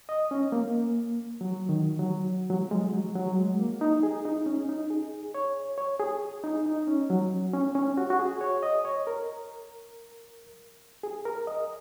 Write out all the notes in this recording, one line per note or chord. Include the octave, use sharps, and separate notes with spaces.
D#5
C#4
A#3
F#3
D#3
F#3
F#3
G#3
F#3
F#3
G#3
A#3
D#4
G#4
D#4
C#4
D#4
G#4
C#5
C#5
G#4
D#4
D#4
C#4
F#3
C#4
C#4
F#4
F#4
G#4
C#5
D#5
C#5
A#4
G#4
A#4
D#5